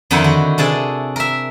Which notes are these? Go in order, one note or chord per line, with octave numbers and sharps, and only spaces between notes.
F2 D3 D#3 D#4 E4 F#5
F#4
C3 D4 G#4 A4
A#4 E5